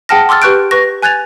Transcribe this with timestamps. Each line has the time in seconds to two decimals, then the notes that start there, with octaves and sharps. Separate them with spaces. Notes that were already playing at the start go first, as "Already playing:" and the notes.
0.09 G#4 F#5 G5 A5 F6 A#6
0.29 C6 D6 E6 F6 A6
0.42 G4 B4 C#6 F#6 G6 D7
0.71 B4 C#6 A#6
1.02 G#5 F#6 G#6 A6 F7